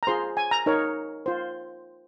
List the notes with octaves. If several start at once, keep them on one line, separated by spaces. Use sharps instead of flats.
A#5
F4 G#4 C5 C6
G#5
A#5
D#4 A#4 C#5
F4 C5